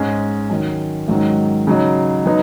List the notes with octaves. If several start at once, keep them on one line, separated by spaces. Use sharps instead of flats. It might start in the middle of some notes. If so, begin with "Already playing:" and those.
Already playing: G#2 G#3 C#4
D#3 F#3 C#4
G#2 D#3 F#3 C#4
C#3 F#3 D#4
F#3 B3 D#4